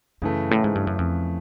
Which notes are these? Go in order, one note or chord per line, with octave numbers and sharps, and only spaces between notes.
F#2 C#3 E3 A3
A2
G#2
G2
F#2
F2